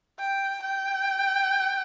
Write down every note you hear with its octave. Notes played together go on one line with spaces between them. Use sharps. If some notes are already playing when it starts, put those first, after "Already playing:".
G5
G5